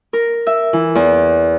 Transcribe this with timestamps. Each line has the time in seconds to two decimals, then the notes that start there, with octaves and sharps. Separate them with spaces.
0.13 A#4
0.47 E5
0.73 E3
0.95 E2